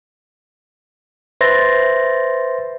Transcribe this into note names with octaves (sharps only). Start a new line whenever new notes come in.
B4 C5 E5 C6 A6 A#6